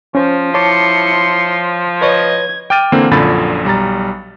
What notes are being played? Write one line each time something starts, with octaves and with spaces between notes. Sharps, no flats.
F3 C#4 C5
E4 C#5 A5 C6 D6 C#7
B4 C#5 D#5 G#6
G5 D6 F6 A6 D#7
D3 E3 A#3 C4
A#1 F#2 A#2 D3 B5 A6
B1 G3 A#5 A6